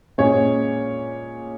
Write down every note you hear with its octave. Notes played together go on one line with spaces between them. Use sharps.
A#2 G#3 C#4 G#4 C#5